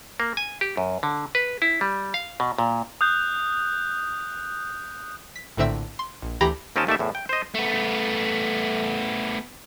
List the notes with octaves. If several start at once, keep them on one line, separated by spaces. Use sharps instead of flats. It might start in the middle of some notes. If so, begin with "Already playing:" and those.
A#3
G#5
G4
F#2
D3
B4
E4
G3
F5
B2
A#2
D#6 F#6 G6
B6
A#1 A2 D3 C4 E5 E6
C6
A#1
D2 E3 G4 A#5 B5 A#6
D#2 C4 C#4 A#4 D#5 A5
D#2 A3 D5 E5
E2 A2
G5
C5 D#5
A3 B3